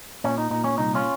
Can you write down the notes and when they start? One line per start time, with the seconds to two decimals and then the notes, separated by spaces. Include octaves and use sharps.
0.24 A#2 C#4
0.38 D#4
0.50 A#2 D#4
0.64 C#4
0.77 C2 D#4
0.95 C#4 F4